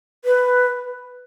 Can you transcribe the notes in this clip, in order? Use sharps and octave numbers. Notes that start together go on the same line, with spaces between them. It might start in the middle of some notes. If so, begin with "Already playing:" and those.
B4